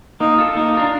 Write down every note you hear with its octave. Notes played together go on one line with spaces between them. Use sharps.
A#3 D#4
F4 A4
A#3 D#4
D4 F4 A#4